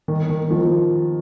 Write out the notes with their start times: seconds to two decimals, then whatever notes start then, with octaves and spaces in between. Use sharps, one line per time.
0.08 D#3
0.30 D#3
0.50 D#3 F3